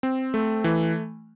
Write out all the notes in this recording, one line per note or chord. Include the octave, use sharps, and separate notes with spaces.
C4
A3
E3